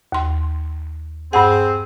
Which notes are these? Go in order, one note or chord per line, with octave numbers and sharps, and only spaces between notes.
D#2 C6
G2 C4 G#4 F#5